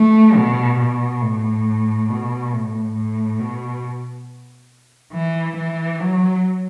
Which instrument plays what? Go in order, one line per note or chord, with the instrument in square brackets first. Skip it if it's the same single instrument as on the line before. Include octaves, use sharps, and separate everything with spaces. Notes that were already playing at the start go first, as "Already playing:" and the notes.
Already playing: [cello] A3
B2
B2
A2
B2
A2
A2
B2
E3
E3
F#3